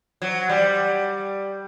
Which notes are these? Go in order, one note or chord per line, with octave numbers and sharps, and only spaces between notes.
F#3
G3